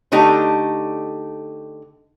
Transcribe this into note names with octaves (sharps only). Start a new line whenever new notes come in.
D3 A3 D#4 G4